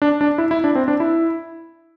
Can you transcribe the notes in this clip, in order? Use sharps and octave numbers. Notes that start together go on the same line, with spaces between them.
D4
D4
E4
E4
D4
C4
D4
E4